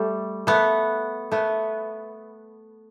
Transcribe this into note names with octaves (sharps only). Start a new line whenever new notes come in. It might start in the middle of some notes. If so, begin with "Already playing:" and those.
Already playing: G3 A3
A3 B3
A3 B3